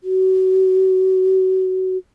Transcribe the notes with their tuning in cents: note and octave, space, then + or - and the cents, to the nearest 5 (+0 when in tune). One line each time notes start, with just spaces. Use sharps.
F#4 +30